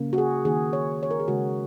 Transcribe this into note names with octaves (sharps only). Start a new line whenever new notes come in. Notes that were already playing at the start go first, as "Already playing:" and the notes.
Already playing: C#3 A#3
F#4
G#4
D#3 A#3 G#4
C#5
C#5
A#4
G#4
C#3 G#3 F#4